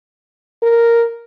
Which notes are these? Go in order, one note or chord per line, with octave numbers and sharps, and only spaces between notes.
A#4